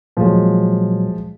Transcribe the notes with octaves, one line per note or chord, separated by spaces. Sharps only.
A#2 F3 F#3 G#3